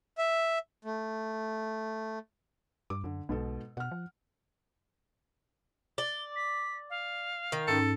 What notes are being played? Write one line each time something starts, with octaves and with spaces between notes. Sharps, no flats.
E5
A3
G2 D6
F#2 D3
B1 G#2 B2 A4
B2 F#5 F6
F3
D5 G7
B6
F5
D#3
G#2 C#4 D#4 A4